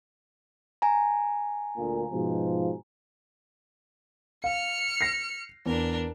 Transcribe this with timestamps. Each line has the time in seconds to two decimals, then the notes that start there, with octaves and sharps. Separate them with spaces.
0.82 G#5 A#5
1.76 D2 A#2
2.11 G#2 B2 F3
4.44 F5 F6 C#7
5.01 A#6 C7
5.66 E2 D4 A#4